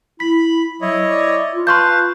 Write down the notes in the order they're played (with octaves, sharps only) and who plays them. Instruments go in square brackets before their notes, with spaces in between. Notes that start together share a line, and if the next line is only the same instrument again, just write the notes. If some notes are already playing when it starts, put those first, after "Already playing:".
[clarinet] E4 [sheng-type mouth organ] B5 [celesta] B6
[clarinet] F#3 [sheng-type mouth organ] E4 C#5 D#5
[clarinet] D5
F4
[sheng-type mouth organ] B4 F5 A5 [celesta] C6 C#6 G6